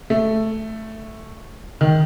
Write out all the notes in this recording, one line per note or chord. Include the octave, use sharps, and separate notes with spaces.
A3
D#3